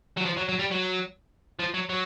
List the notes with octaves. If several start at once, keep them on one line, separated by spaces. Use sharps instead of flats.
F#3
F3
F#3
F#3
G3
F#3
F3
F#3
F#3